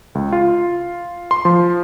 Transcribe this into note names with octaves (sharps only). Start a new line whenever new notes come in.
C#2
F4
C6
F3